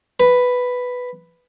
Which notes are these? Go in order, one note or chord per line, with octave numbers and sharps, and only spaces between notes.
B4